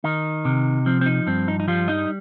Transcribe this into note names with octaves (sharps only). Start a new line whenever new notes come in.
D#3 D#4
C3
F3 C4
C4
D#4
G2 C4
D#4
D#4
F3 G3 F4
D#4 D#5